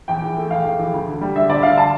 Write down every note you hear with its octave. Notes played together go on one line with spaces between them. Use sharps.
E2 G5
E3
A3
E2 F5
E2
E3
D2
D3
G3
D4 E5
D2 D5
D3 F5
A5